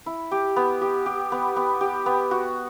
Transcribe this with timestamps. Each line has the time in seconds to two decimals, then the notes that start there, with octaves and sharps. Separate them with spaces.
0.06 E4
0.31 G4
0.56 B3
0.81 G4
1.06 G4
1.32 B3
1.56 B3
1.81 G4
2.06 B3
2.31 F#4